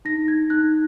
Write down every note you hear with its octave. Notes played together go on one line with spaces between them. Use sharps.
D#4 A#6
D#4 G#6
D#4 F#6